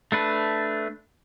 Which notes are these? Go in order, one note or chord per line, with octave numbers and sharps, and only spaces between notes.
A3 D4 B4